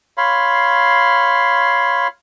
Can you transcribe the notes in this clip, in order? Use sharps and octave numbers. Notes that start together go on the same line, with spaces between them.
C#5 F5 B5 C6